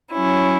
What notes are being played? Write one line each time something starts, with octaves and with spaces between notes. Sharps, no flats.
F#3 C#4 E4